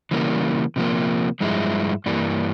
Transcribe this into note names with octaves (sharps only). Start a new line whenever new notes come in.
C#3 E3 G3 A#3
C3 F3 A#3
G2 F3 G#3 E4
G2 E3 G3 A#3